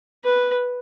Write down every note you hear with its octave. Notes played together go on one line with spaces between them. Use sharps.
B4